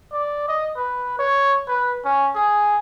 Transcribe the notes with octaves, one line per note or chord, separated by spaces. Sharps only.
D5
D#5
B4
C#5
B4
C#4
G#4